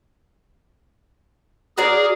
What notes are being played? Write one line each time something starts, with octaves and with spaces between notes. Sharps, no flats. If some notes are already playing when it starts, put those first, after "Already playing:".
F#4 G#4 A#4 D5